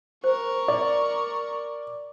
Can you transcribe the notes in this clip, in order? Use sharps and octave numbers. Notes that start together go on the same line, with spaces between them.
A#4 C5 C#6
D5